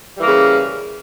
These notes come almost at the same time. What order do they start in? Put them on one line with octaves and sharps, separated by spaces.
G3 E3 A#3 C#3